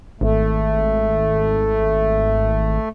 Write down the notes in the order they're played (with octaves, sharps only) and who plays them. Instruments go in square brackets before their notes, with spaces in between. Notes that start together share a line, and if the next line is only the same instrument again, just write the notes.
[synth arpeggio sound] G#1 [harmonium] A3